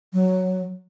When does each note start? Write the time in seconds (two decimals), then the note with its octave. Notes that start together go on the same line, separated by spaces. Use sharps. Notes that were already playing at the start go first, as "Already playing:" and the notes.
0.13 F#3